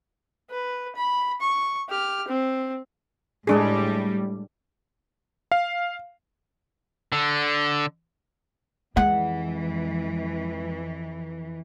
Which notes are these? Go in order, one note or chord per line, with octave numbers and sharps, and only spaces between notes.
B4
B5
C#6
G4 F6
C4
A2 G3 G#3 D4 G#4
F5
D3
F2 E3 G#3 F#5